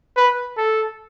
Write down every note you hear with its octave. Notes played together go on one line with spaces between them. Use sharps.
B4
A4